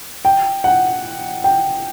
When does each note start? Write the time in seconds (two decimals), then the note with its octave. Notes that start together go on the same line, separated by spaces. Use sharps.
0.25 G5
0.64 F#5
1.44 G5